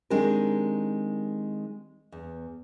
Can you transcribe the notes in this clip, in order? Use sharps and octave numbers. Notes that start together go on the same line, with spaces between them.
D#3 G#3 C4 D4 G4 A#4
E2